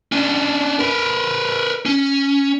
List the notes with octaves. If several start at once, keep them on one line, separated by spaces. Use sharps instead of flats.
C#4 D4
A#4 B4
C#4